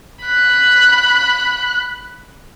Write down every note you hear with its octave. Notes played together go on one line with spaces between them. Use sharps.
B5 F#6